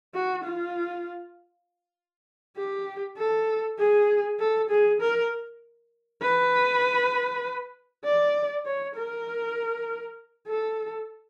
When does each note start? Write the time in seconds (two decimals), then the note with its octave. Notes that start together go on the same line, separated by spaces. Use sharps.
0.14 F#4
0.44 F4
2.57 G4
3.18 A4
3.79 G#4
4.40 A4
4.70 G#4
5.01 A#4
6.22 B4
8.05 D5
8.66 C#5
8.96 A#4
10.48 A4